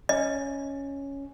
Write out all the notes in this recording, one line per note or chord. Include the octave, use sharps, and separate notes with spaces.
C#4 D#5